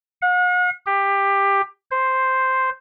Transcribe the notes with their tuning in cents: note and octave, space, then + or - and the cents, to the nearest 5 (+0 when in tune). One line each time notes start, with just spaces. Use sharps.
F#5 -40
G4 +15
C5 +0